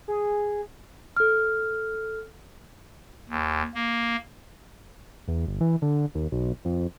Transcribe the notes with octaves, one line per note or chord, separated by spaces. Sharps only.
G#4
A4 F6
D#2
A#3
E2
G1
E3
D3
D#2
B1
F2